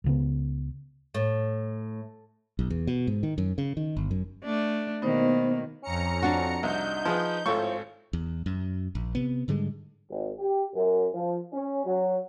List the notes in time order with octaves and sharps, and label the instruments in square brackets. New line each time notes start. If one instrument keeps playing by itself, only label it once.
[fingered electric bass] C#2 C#3 B3
[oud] A2
[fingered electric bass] B1
E2
B2
G#2
D#3
F#2
C#3
D#3
G1
F#2
[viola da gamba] A3 D4
[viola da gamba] B2 D#3 A#3 [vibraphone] B3 D#4 C5
[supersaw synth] F2 A#5 C#7 [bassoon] C#4
[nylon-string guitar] D4 F#4
[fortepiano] C2 [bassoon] D#4 [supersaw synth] G6
[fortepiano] F3 G#4 B4
[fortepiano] G#1 A4 C#6 [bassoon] A2 [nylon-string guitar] F4 C5
[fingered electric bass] E2
F#2
A#1
C3 B3
G#2 D3 G3 G#3
[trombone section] G#1
G4
F#2
F3
C#4
F#3